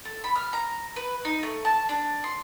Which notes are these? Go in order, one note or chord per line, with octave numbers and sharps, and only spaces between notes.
A4
B5
F6
A#5
B4
D#4
A3
A5
D4
C6